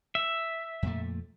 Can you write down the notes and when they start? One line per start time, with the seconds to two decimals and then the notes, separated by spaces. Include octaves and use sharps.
0.15 E5
0.83 F2 A#2 A3